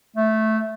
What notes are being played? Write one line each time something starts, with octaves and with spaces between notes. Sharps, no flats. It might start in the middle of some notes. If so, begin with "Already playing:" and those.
A3